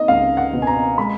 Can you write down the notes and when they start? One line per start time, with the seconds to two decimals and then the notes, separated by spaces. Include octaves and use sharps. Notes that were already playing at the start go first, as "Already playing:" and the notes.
Already playing: A#3 D#4 D#5
0.08 C#2 F5
0.37 F#5
0.53 B2
0.62 G#5
0.67 A#5
0.97 G#3 B5